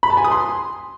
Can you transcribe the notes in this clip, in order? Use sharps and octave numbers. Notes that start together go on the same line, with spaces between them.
B5
A5
G#5
D#6
C6